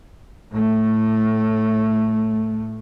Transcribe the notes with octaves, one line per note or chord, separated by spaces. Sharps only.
A2 A3